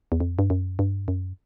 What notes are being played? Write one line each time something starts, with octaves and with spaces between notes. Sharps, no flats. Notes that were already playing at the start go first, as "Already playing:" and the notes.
E2
F2
G2
F#2
G2
F#2